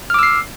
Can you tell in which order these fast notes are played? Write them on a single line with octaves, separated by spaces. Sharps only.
F6 D6 E6 C7